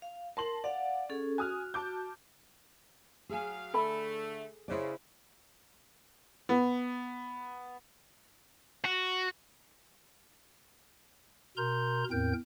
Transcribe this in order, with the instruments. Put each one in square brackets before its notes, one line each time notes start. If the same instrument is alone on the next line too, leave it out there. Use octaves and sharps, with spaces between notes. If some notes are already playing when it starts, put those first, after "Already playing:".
[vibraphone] F5
[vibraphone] A#4 [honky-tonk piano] A5 C6 F#7
[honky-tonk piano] D5 [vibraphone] F5 F#5
[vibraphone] C#4 G#4 A4
[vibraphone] F#4 [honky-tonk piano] G#5 D#6 F6
[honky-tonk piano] A5 D6 G6
[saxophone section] F#3 F5 [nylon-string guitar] G#4 G#5
[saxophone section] D3 A3 [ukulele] A4 B5
[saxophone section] C#3 [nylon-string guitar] E4 C5 D5
[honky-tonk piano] B3
[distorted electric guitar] F#4
[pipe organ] B2 A#4 A#5 C6 G6
E2 A2 C4 A#4 G5 G6